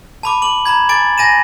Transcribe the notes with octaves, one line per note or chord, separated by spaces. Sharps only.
A5 B5 D6
D6 F#7
A#5 B5 G#6
G#5 D6 A6 D7
G#5 A#6 D#7 E7